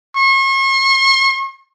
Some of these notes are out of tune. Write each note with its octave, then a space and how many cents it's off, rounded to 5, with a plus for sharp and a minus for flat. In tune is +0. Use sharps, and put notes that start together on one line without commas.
C#6 -40